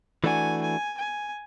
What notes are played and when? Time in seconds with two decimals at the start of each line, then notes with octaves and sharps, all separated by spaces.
0.24 E3 A3 D4 F#4 G#5
0.62 G#5
0.98 G#5